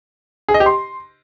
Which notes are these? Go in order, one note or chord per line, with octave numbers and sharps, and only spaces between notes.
G#4
D#5
G4
C6